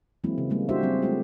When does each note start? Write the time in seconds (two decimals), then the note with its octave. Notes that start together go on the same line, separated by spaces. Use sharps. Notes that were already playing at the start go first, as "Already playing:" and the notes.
0.24 E3 F#3 G#3 A#3 C4 E4
0.38 C#3
0.50 G3 G#3 A#3
0.69 D4 E4 F#4 G4 C5 E5
0.83 F#3 G3 C4 G#4
1.02 G#3 A3 F4 G4